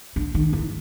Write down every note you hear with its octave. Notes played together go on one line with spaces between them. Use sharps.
D3
D#3
E3